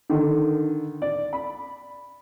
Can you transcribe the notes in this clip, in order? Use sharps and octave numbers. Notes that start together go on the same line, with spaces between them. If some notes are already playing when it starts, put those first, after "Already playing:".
D3 D#3
D5
B5